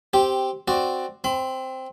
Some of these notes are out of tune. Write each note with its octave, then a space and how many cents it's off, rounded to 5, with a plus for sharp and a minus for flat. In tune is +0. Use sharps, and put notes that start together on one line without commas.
C4 +0 G4 -5
C4 +0 F#4 +0 D5 +10
C4 +0 B5 +40